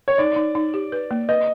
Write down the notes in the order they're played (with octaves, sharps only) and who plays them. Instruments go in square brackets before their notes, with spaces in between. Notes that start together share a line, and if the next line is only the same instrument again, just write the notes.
[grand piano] C#5
[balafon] D#4 [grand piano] D5
[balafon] D#4
D#4
G4
B4
A#3
[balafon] B4 [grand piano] D#5